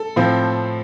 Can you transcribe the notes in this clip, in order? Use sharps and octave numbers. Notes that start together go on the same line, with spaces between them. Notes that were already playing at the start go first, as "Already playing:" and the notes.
Already playing: A4
A2 F3 C4